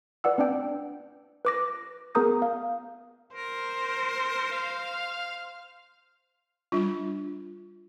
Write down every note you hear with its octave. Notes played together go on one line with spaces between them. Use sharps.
B4 D5 F#5 E6
C4 D4 D5 G5
B4 D6 A#6
B3 G#4 A#4 A#5 D#6 G6
F5
A#4 C5
F5
G3 D4 F4